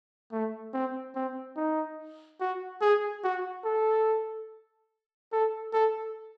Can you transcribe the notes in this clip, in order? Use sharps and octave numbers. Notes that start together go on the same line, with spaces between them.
A3
C4
C4
D#4
F#4
G#4
F#4
A4
A4
A4